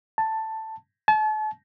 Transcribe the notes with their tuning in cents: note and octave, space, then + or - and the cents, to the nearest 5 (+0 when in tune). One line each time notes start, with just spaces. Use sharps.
A5 +5
A5 -40